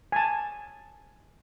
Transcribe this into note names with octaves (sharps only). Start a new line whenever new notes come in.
G#5 A5